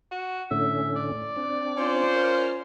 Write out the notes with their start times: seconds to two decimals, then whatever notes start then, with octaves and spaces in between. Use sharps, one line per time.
0.12 F#4
0.51 A2 D3 C#4 E5
0.96 D5
1.36 C4 D4
1.78 C#4 F4 C5
2.15 A#4 F6